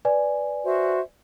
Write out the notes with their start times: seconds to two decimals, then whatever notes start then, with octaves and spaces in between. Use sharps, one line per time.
0.05 B4 D5 G#5
0.64 F#4 C5 E5